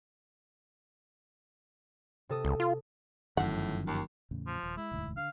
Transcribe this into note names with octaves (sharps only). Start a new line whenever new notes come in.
C3 A4 D#6
C#2
F4
G1 F#2 A2 D#3 F3 F#5
D#2
E2 A2 C#3
F3
D#1
G#3 E4
E1 D2 G#2
D3 F5